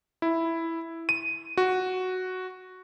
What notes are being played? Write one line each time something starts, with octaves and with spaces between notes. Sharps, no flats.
E4
D#7
F#4